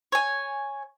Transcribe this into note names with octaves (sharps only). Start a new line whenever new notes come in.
C#5 G#5